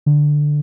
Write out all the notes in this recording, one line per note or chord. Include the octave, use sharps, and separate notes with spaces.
D3